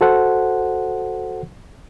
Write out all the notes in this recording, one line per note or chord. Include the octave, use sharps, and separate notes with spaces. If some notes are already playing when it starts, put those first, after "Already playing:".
F#4 A4 C5 F#5